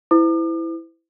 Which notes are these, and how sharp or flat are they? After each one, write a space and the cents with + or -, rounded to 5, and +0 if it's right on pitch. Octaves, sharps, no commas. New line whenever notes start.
E4 +0 C5 -40 D6 +45